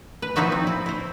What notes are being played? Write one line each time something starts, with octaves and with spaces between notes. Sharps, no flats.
B4
F3 D#4 E4 F#4 E5
C4
E4
E4 C5